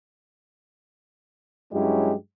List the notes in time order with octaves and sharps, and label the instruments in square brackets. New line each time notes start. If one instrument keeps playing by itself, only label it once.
[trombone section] G2 F#3 G#3 C#4 E4 G4